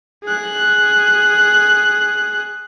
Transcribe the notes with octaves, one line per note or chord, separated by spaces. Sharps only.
G#4 F#6